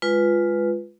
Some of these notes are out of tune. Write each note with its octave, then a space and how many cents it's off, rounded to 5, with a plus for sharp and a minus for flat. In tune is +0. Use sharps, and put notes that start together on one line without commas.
G#3 +0 F4 +0 B4 +0